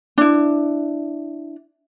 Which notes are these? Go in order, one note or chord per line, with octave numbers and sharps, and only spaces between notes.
D4 E4